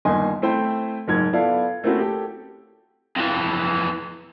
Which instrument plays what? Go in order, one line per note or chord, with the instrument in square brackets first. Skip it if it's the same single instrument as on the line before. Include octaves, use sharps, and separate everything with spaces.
[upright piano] G1 D#2 D#5 G#5 C6
A3 C4 E4 C5 G5
F#1 G#2 G#6
B3 E4 F4 A4 D5 F5
A3 A#3 C4 C#4 E4 F#4
G4 A4
[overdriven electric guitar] F2 E3